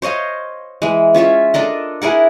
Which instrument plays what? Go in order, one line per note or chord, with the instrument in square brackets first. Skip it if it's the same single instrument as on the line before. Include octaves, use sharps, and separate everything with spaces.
[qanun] C5 C#5 D#5 F5
E3 G#3
C#4 F4 C#5 E5
D4 A4 A#4 D#5
E4 G#4 A#4 F#5